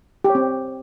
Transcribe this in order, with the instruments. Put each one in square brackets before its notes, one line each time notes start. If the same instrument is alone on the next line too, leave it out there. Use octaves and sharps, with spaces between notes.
[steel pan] G4
C#5
C4